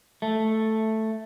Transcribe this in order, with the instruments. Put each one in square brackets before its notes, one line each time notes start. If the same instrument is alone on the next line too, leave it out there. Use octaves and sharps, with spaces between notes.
[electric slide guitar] A3